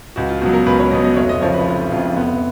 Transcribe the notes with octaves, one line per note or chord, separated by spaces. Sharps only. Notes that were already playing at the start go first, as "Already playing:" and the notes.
C#2 F#4
F4
B2 F#3 F#4
A#4
C#2 B4
C#5
B2 F#3 D#5
D#5
F1 C#5
D#5
F2 C#3 F3 C#5
B4
F1
F2 C#3 F3 F4
F1 B3